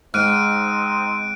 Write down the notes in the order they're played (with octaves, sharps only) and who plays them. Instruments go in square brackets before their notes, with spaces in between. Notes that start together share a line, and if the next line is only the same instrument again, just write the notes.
[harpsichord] G#2 [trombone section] C4 D#4 [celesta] F6 [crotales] F#6 D7 D#7